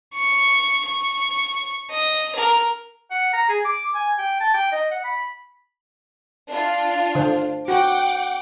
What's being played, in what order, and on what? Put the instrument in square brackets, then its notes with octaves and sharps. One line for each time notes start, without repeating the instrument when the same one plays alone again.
[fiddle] C#6
C#6
D#5
A#4
[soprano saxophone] F#5
A#5
G#4
D6
G#5
G5
A5
G5
D#5
F#5
B5
[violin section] D4 F4
[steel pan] D3 C5
[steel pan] F#4 [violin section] F#5 G5 D6